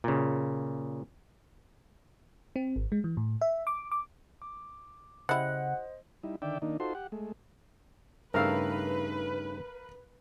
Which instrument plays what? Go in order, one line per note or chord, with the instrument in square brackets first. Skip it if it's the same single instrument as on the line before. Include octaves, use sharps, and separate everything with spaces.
[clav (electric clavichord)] A#2 C#3
[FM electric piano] C4
G#1
G#3
E3
A2
E5
D6
D6
[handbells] D6
[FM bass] C#3 [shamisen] G3 E4 [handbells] C5 D#5 [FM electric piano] F#5
[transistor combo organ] G3 D#4 E4
D3 D#3 D5 E5 G5
D#3 A#3 D4 D#4
D#4 F4 F#4 A4 C5 C6
G4 F#5
G#3 A3
[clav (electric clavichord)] G2 C#3 A3 [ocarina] D#4 [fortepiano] A#4 F5 E6 [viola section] B4